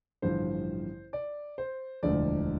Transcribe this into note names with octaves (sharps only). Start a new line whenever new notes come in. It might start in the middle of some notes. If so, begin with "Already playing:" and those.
A1 G2 D3 F3 C5
D5
C5
E1 D2 D3 F3 D5